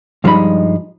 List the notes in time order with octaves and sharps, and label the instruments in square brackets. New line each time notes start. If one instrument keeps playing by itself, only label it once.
[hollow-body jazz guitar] G2 F3 G3 G#3 D#4 B5